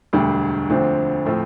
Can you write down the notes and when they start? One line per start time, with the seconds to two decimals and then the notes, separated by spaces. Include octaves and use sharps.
0.13 E1 D2 D3 G3
0.69 D2 D3 F3 C4
1.25 A2 F3 A3 C4